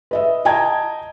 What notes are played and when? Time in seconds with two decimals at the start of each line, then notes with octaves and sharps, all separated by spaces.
0.11 B4 D#5 E5
0.45 D#5 G5 A5 A#5 G#6